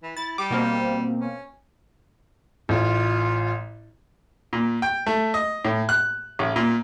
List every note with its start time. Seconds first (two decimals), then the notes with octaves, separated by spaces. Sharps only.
0.03 E3
0.17 E4 A6
0.38 G3 D6
0.51 B2 A#3 C4
1.21 C#4
2.69 A1 F4
4.53 A#2
4.82 G5
5.06 A3
5.34 D#5
5.65 A2
5.89 F#6
6.39 A1
6.56 A#2